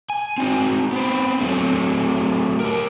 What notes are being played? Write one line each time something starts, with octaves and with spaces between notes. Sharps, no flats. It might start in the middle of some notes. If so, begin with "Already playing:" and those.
G#5
C4 D#4 F#4
B3 C4
F#3 A3 C4
G4 A#4